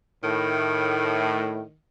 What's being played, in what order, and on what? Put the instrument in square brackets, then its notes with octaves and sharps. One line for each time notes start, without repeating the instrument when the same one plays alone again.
[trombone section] A2 [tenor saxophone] D#3